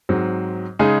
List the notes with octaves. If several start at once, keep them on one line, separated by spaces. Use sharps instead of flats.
G#2 F#3 C4
C#3 G#3 D#4 G#4